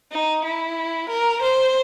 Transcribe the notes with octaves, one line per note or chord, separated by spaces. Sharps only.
D#4
E4
A#4
C5